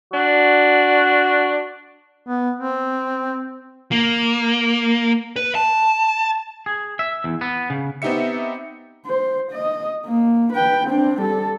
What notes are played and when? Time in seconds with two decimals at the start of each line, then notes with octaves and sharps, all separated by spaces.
0.13 D4 F#4
2.26 B3
2.56 C4
3.92 A#3
5.36 B4
5.55 A5
6.66 G#4
6.99 E5
7.24 E2
7.41 B3
7.70 C#3
8.02 B3 C4 D#4 G4 E5 C#7
9.06 C5
9.51 D#5
10.06 A#3
10.53 B4 G5
10.88 C4 D4
11.20 G3 A4